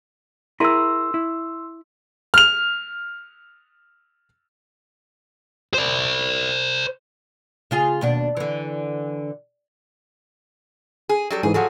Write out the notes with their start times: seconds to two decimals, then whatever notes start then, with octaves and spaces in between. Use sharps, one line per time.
0.60 E4 G#4 A#4 C6 E6
1.14 E4
2.34 F6 F7
5.74 C5 D5
7.71 C#3 F4 G#4
8.01 D#2 B2 D4
8.37 D3 E3
11.09 G#4
11.30 F#3 G3 A4
11.43 G#2 E3 G#4
11.54 F3 F#3 G#4 A4 F#5